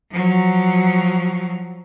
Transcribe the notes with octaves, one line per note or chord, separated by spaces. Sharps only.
F3 F#3